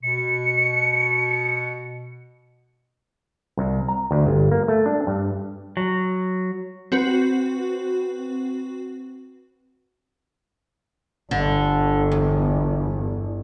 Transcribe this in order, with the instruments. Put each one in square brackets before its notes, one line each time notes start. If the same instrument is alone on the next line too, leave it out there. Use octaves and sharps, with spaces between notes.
[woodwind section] B2 [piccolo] C#7
[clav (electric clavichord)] C2
A#5
D2
G1
A#3
A3
D4
G2
[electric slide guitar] F#3
[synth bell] C4 F#4 B4
[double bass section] G1 [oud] D3
[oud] E2